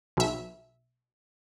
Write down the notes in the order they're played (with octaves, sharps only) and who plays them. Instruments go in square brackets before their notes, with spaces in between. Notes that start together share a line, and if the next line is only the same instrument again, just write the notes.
[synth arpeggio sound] B1 E5